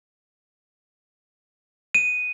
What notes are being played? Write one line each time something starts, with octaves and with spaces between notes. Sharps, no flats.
D#7